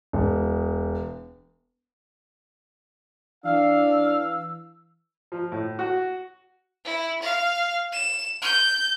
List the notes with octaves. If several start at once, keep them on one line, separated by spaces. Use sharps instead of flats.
E1
E3 D4 F5 E6
F3
A2
F#4
E4
F5
E7
G6